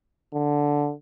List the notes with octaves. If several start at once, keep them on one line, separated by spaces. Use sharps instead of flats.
D3